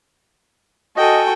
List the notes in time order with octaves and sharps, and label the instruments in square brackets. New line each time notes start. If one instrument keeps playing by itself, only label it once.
[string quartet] F#4 G5 G#5 [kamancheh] A4 [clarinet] D#5